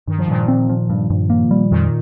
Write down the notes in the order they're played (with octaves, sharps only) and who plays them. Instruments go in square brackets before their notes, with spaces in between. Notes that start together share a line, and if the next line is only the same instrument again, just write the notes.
[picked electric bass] G2 [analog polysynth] D#3
[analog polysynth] F3
[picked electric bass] G2 [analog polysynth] A#2 D#3
[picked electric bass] C4
F3
G2
G2
A#3
G3
[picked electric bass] F2 [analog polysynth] A#2 D#3